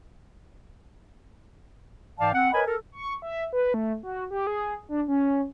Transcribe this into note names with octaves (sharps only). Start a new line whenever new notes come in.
G#2 E3 D5 F5 G5 A5
C4 F#5
A#4 B4 C#5 D#5 G#5 B5
A4 A#4
C#6
E5
B4
A3
F#4
G4
G#4
D4
C#4